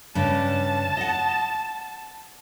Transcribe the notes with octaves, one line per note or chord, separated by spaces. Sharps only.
G2 C#3 D4 A5
D#5 F#5